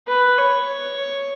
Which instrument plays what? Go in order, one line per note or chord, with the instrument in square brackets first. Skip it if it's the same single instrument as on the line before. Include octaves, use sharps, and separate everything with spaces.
[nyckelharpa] B4
C#5